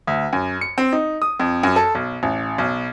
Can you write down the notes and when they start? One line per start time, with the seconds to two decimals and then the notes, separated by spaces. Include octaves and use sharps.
0.07 D2
0.33 F#2
0.61 C#7
0.78 C4
0.92 D#4
1.22 D#6
1.40 F2
1.63 F#2
1.76 A4
1.95 B1
2.23 A1
2.58 B1